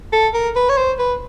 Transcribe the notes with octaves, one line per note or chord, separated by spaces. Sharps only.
A4
A#4
B4
C#5
C5
B4